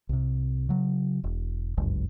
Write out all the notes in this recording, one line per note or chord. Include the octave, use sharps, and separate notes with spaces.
C2 C3
C#3 F#3
E1
G1 C#2 F#2